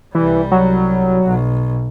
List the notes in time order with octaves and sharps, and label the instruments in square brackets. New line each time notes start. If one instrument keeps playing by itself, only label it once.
[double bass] C2 G3 [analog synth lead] E3
[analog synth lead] F#3
[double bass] B1